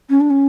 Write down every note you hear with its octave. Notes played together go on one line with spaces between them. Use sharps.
C#4
D4
C#4